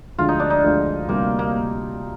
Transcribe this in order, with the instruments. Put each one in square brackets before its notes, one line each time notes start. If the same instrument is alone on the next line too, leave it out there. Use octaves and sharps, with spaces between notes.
[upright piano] D2 D3 F3 G#3 [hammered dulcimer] F4
[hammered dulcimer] D#4
D4
D#4
[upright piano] D2 D3 F3 G#3
[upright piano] D2 C3 G3 [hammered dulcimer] A#3
[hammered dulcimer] A#3